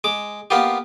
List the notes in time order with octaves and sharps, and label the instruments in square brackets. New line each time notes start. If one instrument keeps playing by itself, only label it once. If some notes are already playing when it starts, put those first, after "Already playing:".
[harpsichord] G#3 D6
A#3 B3 F4 G4